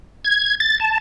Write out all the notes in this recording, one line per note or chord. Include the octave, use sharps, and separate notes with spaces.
G#6
A6
A5